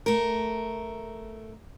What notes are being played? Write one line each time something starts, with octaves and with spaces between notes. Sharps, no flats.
A3 A#4